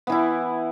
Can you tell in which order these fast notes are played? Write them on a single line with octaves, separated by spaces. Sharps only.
B3 E3 E4